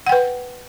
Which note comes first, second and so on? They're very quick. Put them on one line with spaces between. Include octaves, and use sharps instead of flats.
F#5 G5 B4